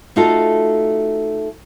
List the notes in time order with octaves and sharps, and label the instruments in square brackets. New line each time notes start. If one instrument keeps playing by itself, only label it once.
[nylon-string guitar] A3 D#4 F4 F#4 A4